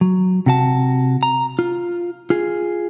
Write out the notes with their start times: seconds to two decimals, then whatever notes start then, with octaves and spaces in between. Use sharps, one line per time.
0.01 F#3
0.46 C3 F#4 A5
1.23 A#5
1.59 F4
2.30 F4 G#4